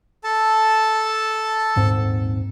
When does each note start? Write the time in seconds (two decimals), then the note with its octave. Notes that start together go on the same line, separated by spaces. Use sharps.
0.24 A4 A5
1.76 D#1 G#2 C4